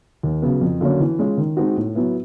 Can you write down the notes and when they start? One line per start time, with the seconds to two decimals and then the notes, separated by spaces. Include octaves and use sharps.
0.23 D#2
0.42 C#3 F#3 B3
0.61 F2
0.81 D3 F#3 A#3 C#4
1.00 E3
1.19 G#3 C#4 F4
1.37 D#3
1.57 G#3 C4 D#4 F#4
1.77 A2
1.95 F#3 B3 E4